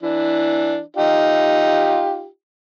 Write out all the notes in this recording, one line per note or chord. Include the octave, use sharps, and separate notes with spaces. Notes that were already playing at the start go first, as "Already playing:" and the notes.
E3 D4
D#4 F4 G4